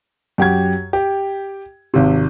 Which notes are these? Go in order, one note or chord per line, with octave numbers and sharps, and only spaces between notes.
F#2 G4 F#5 G#6
G4
G#1 C3